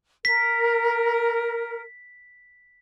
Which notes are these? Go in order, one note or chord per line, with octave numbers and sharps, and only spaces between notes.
A#4 B6